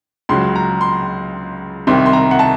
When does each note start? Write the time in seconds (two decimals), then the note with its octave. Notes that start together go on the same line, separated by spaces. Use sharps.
0.29 C#2 C#3 F#3 C6
0.56 A#5
0.81 C6
1.87 C2 C3 D#3 C6
2.06 C6
2.13 A#5
2.31 F#5
2.39 A5